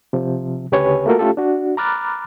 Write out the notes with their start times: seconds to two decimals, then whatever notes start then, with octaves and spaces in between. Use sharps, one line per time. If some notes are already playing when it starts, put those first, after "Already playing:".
0.13 C3 F3
0.72 D2 C#3 G4 B4 C#5 G#5
1.06 A3 A#3 F4 F#4 A4 A#4
1.19 A3 C#4 F4 G4 A4
1.37 D4 F#4
1.77 A#5 B5 D6 F6 F#6 A6